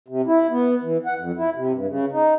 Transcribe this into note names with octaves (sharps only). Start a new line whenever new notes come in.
C3
E4
B3
E3
F#5
F2
E4
C3
G2
C#3
D#4